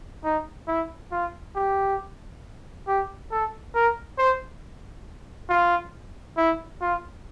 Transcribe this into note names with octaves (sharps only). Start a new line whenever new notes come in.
D#4
E4
F4
G4
G4
A4
A#4
C5
F4
E4
F4